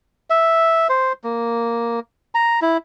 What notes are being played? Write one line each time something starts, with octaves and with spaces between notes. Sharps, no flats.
E5
C5
A#3
A#5
E4